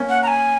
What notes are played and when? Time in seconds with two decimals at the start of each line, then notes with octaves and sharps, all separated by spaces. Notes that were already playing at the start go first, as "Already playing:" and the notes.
Already playing: A#3 C#4
0.09 F#5
0.23 A#5
0.28 G#5